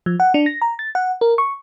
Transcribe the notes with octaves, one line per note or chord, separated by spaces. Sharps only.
F3
F#5
D4
A#6
A#5
A6
F#5
A#4
C#6